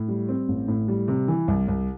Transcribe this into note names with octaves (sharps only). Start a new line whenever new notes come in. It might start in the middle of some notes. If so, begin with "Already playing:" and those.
Already playing: A2
G3
C4
A1
A2
G3
C3
E3
C2
C2